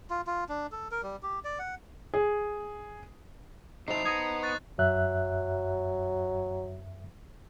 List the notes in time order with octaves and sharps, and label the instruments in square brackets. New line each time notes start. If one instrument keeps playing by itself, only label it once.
[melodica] F4
F4
D4
A4
A#4
G3
G4
D5
F#5
[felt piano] G#4
[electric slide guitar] C3 F#3 E4 [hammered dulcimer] D#4 C5 A5 [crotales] C7 F7
[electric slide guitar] B3 [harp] A#5 D#6 G#6
[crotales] C#6 F#6 A6
[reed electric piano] F#2 E5 F#6 [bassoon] F#3